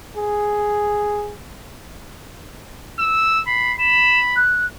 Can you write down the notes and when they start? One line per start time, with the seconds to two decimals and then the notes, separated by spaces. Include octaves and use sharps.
0.16 G#4
2.99 E6
3.47 B5 C7
3.79 B5 E7
4.36 F#6